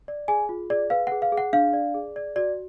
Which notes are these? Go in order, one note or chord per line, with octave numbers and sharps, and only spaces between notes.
D5
G#4 G#5
F4
G#4 D5
B4 F5
G#4 F#5
F5
G#4
F#5
D4 F5
D5
G#4
D5
F#4 D5